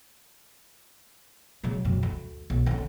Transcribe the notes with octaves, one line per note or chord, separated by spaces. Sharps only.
C#3 F#3
F#2 C3
D2
B1
D3 C#4